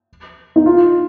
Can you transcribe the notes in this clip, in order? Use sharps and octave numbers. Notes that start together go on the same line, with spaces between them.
D#4
F4